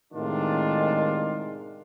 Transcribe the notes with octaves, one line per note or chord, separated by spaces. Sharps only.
A2 C3 D#3 G#3 D4 F4